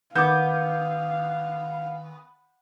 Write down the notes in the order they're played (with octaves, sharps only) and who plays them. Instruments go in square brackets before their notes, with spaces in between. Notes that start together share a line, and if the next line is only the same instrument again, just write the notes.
[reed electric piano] D#3 [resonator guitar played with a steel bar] B3 [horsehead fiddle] F5 [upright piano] D6 G6